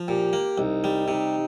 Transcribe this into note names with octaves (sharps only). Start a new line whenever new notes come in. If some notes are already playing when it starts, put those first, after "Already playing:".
Already playing: F3
A#2 G4
A#3
C2 D#4
G3
C3 D#4